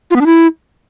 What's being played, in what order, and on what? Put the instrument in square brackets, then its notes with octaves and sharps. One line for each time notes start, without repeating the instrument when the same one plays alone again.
[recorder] F4
B3
D4
E4